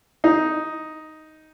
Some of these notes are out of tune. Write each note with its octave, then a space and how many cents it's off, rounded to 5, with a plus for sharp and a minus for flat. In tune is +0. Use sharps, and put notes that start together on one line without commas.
D#4 +5